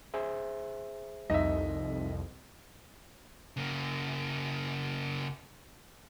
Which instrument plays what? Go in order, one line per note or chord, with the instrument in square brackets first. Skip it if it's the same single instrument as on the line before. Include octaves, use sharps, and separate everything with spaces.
[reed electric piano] G#4 C5 E5
[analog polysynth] C2 F2 [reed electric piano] G3 D#4 [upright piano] D#5 E5
[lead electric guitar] C#3 A#3